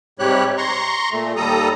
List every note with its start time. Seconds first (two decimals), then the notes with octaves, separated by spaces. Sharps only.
0.19 G#2 C3 G3 G4 C#5 F#6
0.58 A#5 C6 C#6
1.12 A#2 A3
1.36 D#2 G3 A4 A#5 D#6